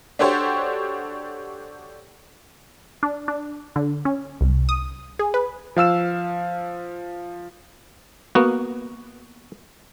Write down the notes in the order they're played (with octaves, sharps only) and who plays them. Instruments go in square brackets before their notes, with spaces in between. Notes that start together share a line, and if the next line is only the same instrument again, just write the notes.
[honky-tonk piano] D4 F#4 G4 A4 C5 C#5
[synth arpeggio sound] D4
D4
D3
C#4
C2
D#6
G#4
B4
[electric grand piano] F3 F5 E6 E7
[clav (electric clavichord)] A#3 B3 F#4